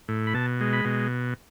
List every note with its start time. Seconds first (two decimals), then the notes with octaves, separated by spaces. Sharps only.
0.08 A2
0.27 B5
0.34 B2 A5
0.60 G#3
0.73 B5
0.85 B2